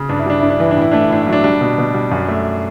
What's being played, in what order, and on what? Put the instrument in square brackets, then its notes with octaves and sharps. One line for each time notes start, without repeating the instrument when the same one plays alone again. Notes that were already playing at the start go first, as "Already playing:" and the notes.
Already playing: [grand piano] C#3
G2 D4
E4
G3 D4
G2 E4
D4
E3 E4
D4
A2 E4
A3 D4
E4
A2 D4
F#3 E4
D4
G3 D4
B2
B2
G3
F#2
A3